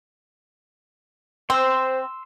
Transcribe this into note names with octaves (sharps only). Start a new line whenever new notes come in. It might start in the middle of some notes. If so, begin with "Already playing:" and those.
C4 C5 C6 E6